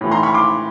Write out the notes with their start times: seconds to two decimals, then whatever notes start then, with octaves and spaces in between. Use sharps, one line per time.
0.01 A2 E3
0.11 A#5 C6
0.23 B5 C#6
0.34 C6 D6